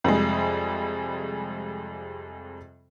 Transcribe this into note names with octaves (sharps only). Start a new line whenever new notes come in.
F2 C3 G3 G#3